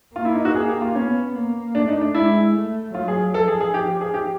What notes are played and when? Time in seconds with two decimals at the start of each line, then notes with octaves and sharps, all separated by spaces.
0.15 A#3 F4
0.25 E4
0.35 D#4
0.45 F#4
0.55 G#4
0.68 G4
0.82 F4
0.95 B3 C#4
1.35 A#3
1.74 A3 D4
1.88 D#4
2.01 D4
2.14 G#3 E4
2.55 A3
2.94 F#3 F4
3.08 G#4
3.34 F3 A4
3.48 G#4
3.61 G#4
3.74 F3 G4
4.01 G#4
4.14 G4